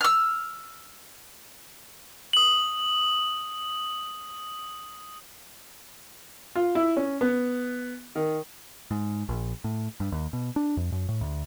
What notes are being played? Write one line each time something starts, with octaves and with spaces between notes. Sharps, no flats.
E6 F6
D#6 F#7
F4
E4
C#4
B3
D#3
G#2
A#1
A2
G2
D#2
B2
D4
F2
F#2
A2
D2